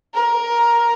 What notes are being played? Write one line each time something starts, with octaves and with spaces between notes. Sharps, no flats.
A#4